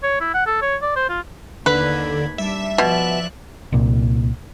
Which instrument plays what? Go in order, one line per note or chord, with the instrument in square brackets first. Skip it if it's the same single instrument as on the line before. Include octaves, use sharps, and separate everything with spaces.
[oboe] C#5
E4
F#5
A4
C#5
D5
C5
F4
[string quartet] D#2 B5 G#6 [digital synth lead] D3 [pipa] B4
[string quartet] G3 D4 [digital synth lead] E5
[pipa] B2 [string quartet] F3 D5 F#6
[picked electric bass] C2 A#2